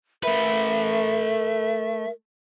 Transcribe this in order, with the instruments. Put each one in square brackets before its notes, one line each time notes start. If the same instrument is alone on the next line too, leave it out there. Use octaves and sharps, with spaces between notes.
[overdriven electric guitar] A3 B4 [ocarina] A#4 [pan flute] E5